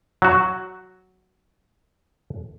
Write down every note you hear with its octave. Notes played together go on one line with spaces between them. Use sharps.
F#3 F#4